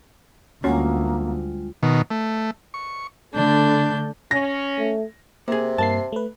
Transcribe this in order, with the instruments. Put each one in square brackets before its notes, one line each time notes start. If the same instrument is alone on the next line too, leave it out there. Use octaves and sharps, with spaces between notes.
[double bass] D2 [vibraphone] G3 G#3 F4 [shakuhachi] A#3 [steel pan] C#4 F#4 C#5
[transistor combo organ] B2 D#3
A3
C#6
[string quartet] D3 A3 D4 G6
[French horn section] C#4 [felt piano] A#6
[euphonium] A3
[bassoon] C3 [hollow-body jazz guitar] A#3 G#4
[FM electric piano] G2 A#3 C7 [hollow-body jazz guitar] A5
[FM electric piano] A3 B4